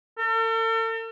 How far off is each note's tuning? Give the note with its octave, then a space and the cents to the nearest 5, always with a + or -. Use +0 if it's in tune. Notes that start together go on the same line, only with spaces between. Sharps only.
A4 +45